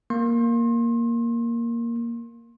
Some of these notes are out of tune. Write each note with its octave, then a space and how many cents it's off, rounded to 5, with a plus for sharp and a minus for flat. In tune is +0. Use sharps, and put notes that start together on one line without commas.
A#3 +0 C6 +35